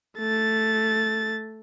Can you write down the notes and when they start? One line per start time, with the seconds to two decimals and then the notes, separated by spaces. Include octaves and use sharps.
0.19 A3 A6